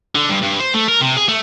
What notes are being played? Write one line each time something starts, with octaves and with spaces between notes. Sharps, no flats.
D3
G2
G2
C5
A3
A#4
C3
G#4
A3